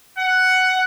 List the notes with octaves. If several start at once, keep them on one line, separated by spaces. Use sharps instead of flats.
F#5